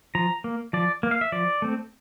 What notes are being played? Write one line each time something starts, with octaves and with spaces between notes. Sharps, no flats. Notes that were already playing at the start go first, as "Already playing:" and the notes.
F3 A#5
A#3
F3 D5
A#3
F5
E5
F3 D5
A3 C4